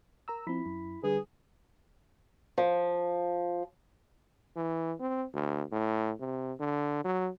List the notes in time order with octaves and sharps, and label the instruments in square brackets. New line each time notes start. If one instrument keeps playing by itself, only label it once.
[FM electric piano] A#4 A#5 E6
[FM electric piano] F3 C4 [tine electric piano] E4 B5 B6
[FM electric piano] F#2
[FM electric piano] D3 G3 [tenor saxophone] G#4 [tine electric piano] B4
[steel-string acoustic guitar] F3
[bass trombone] E3
C4
D2
A2
C3
D3
F#3